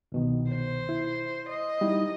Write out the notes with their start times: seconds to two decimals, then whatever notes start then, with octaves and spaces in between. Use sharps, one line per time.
0.12 C2 B2 D#3
0.50 C5
0.89 E4
1.49 D#5
1.81 G3 D#4 E4